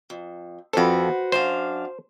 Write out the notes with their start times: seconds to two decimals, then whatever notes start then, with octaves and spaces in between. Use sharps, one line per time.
0.10 F2
0.73 F2 F#4 A4 B4 C5
1.32 F#2 D4 C5 F5